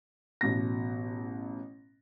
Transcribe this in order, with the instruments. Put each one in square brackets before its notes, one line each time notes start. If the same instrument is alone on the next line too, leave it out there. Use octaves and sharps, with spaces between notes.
[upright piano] A1 B2 A#6